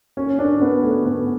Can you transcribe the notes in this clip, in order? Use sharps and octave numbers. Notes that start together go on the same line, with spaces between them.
C#4
D4
B3
A3
B3